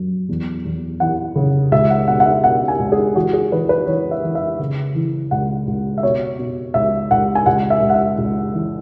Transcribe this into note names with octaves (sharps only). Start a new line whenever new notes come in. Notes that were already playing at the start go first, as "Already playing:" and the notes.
Already playing: F#2
E2
E2
E3 F#5
C#3
C#2 E5
F#5
B2 F#5
F#5
E5
B2 F#5
G#5
C#2
G#4
E3 F#4
G#4
E3 B4
B4
E3 C#5
E5
E3
E5
C#3
E3
C#2 F#5
C#2
E5
B2 C#5
B2
C#2 E5
C#2 F#5
G#5
C#2 F#5
E5
C#2
F#5
E5
C#2
E3